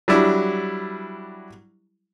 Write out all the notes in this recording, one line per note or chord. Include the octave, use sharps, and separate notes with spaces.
F#3 G3 D4 E4